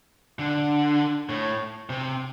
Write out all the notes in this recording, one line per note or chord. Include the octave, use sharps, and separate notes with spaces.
D3
A2
C3